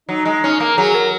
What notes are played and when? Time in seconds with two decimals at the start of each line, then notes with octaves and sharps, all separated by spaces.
0.09 F#3 D#4
0.26 G#3 D#4
0.43 C#4 D#4
0.60 A#3 A#4
0.77 F#3 G#4
0.95 A#4